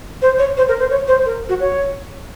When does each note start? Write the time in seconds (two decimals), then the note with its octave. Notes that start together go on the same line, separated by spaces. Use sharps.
0.22 C5
0.39 C#5
0.57 C5
0.68 A#4
0.79 C5
0.91 C#5
1.08 C5
1.26 A#4
1.49 F#4
1.60 C#5